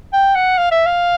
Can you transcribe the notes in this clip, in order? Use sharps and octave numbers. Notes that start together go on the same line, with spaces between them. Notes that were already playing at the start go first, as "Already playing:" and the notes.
G5
F#5
F5
E5
F5